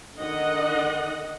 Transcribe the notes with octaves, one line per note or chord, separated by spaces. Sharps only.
D3 D#3 D#5 F#5